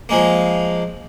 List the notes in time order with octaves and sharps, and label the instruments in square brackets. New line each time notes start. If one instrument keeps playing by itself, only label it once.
[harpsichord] F3 G#3 A#3